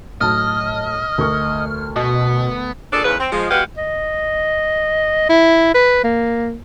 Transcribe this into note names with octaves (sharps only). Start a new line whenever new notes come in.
A2 F#3 D#5 A5 F6
D2 A#4 C#6
B2 B3
A#2 D4 G#4 A4 D5
E2 G#2 C#3 B4
C4
F3 G#3
B2 G#3 F#4 G4 B4 F5
D#5
E4
B4
A#3